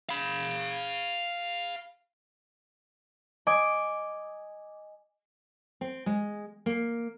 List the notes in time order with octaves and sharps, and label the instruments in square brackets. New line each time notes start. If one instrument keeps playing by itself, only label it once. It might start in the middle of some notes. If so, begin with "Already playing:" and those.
[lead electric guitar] F5 B5
[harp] D#5 G#5 D6
[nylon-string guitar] C4
G#3
A#3